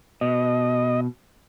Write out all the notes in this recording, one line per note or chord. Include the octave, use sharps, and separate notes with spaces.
B2 D#5